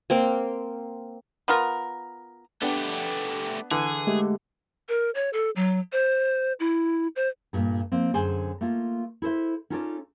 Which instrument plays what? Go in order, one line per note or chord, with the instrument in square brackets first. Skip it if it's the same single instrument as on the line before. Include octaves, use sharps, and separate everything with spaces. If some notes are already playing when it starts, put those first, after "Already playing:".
[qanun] A#3 C4 F5 G5
[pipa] B3 F4 A#4
[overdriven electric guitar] A3 G4 [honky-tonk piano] B3 D4
[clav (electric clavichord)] D3 [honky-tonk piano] E3 [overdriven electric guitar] G#4
[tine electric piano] G#3 A3 G4
[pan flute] A#4
C#5
A4
F#3
C5
E4
C5
[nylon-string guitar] G2 A#2 A3
F3 A#3 C4
F#2 D3 G#4 C5 G5 G#5
A3 A#3 F4
E4 A4 C5 E5
C#4 D#4 F4 A4 C#5 D5